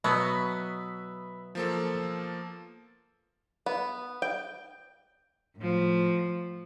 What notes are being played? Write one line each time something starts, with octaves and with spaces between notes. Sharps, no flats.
B2 F#3 B3 E5 B5 D#6
F3 A#3 A4
B3
G5
A2 F3